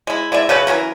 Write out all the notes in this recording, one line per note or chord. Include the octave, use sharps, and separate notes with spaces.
G#3 E4
G#3 E4 D5 E5
C#3 F#3 C#4 B4
E3 F#3 C#4 A#4